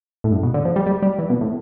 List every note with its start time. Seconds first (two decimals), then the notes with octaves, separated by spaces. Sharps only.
0.24 A2
0.32 G2
0.43 B2
0.54 D3
0.65 F3
0.76 G3
0.87 G3
1.02 G3
1.19 E3
1.30 B2
1.41 A2